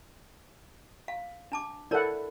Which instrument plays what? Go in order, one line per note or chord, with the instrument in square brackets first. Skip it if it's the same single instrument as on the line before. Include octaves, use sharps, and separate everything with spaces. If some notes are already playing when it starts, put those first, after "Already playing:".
[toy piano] F5
D4 A5 D6
[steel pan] E4 A4 F#5 [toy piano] A#4 C#5 D5